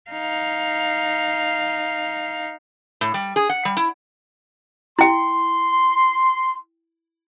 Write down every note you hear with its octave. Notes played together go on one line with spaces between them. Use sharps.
D#4 F5
A2
G3
G#4
F#5
G3
E4
E4 G5 C6